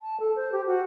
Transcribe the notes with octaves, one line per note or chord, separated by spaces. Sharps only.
A5
A4
C5
G4
F#4